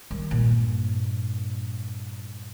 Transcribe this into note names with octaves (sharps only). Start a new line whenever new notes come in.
D#3 G3
G2 A#2